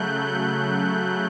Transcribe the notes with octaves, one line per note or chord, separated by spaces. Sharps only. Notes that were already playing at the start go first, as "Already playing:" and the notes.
Already playing: C#3 F#3 A3 F#6 G6
G6